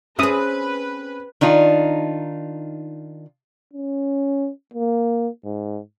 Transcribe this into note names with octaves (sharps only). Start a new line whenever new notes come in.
C4 C#4 G#4 B4 E5 D#6
D#3 D4 D#4 F4
C#4
A#3
G#2